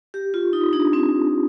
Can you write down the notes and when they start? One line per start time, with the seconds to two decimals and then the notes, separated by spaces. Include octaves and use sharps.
0.14 G4
0.34 F4
0.53 D#4
0.73 D4
0.93 C4